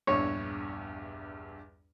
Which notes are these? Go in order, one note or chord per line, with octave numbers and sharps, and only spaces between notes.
A#1 E2 G2 C#5